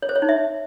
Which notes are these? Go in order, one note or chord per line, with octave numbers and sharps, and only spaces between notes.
C#5
C5
C#5
D#4
E5